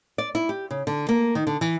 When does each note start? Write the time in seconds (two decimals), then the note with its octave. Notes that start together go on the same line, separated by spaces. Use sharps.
0.18 D5
0.35 E4
0.49 G4
0.71 C#3
0.87 D3
1.09 A#3
1.35 D#3
1.47 D3
1.61 E3